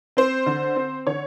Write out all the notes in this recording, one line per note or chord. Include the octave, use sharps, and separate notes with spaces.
C4 C5
D3
C4
D3 C#5